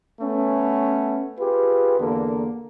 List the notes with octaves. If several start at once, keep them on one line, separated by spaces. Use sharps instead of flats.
A3 B3 C#4
F4 G4 G#4 B4
E2 D3 A#3 A4